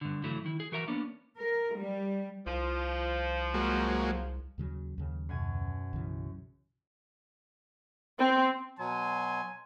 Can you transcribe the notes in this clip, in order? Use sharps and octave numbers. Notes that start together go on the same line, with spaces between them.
G2 D3
C#3 E3 F#3 A3 E4
D#3 E4
G#4
E3 F#4 A#4 E5 G#5 A#5
A#3 B3 C#4 D4
A#4
G3
C2 F3
F#3 G#3 A#3
D#2 C#3 F#3
D#2 C#3 F#3
F#2 B2 G#5
B1 C#3 E3
C4
B2 F#3 G#5 C6